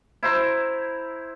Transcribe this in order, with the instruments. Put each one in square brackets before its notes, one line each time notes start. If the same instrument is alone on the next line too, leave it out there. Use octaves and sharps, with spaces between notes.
[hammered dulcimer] E4 C5 A#5